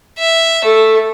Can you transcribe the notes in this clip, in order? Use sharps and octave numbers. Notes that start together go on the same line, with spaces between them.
E5
A3 A4